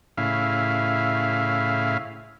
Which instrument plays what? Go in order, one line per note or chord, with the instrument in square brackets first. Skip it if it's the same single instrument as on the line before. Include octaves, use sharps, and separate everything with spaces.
[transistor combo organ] A2 C#3 E4 F5